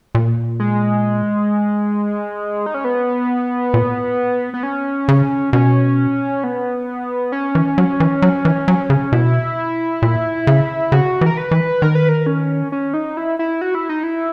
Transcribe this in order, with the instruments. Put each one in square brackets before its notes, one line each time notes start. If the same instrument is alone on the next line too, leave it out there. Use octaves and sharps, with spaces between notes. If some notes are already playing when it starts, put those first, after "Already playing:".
[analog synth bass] A#2
[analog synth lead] G#3
D#4
C#4
B3
[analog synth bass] A#2
[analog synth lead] B3
C#4
[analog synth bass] C#3
[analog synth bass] B2 [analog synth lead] C#4
[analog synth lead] B3
C#4
[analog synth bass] E3
F#3
E3
F#3
E3
F#3
C#3
[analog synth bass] B2 [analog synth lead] E4
[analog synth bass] A#2
C#3
[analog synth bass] C#3 [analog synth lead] F#4
[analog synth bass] E3
[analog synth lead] A#4
B4
[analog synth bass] E3
[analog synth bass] D#3 [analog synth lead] A#4
[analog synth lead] B4
A#4
C#4
C#4
D#4
E4
E4
F#4
E4
D#4
E4